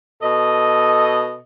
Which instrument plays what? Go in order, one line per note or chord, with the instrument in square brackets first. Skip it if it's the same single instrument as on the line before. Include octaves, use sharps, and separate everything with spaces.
[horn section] B2 A4 D#5